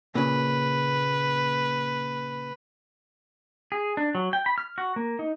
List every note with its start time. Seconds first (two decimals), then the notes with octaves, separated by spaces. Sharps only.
0.15 A#2 C#3 B4
3.72 G#4
3.97 D4
4.15 F#3
4.33 G5
4.46 B5
4.58 F6
4.78 F#4
4.96 A#3
5.19 D#4